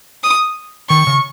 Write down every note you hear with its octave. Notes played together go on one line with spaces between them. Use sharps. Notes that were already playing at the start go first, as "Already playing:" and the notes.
D#6
D#3 C#6
C#3